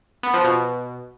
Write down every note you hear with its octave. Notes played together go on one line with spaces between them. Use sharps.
B3
F3
B2